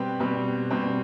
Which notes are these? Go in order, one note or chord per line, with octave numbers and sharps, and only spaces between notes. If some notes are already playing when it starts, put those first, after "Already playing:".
Already playing: B2 G3 C4 G4 B4
B2 G3 C4
B2 G3 C4